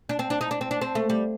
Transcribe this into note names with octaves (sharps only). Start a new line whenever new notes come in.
D4
C4
D4
D#4
D4
C4
D4
C4
A3
G3